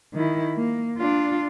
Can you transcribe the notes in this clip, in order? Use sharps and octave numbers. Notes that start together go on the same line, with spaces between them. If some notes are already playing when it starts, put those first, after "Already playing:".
D#3 E4
A#3
D4 F4